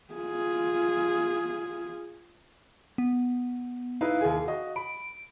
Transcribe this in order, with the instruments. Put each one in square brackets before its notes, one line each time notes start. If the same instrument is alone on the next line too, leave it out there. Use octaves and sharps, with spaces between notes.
[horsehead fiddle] F4 G#4
[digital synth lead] B3
[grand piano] D#4 E4 B4 [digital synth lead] F5
[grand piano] D#2 G#4
F#4 D#5
[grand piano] B5 [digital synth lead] D7